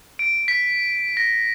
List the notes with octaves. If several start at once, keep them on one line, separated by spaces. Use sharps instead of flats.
D7
B6
A#6